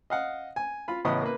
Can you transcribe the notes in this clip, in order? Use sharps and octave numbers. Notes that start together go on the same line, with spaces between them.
D#5 F5 F#5
G#5
F4 B5
A1 C#3 B3 D#5 D#6
A#3 B4